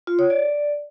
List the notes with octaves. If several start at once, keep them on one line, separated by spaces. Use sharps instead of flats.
F4
C#5
D5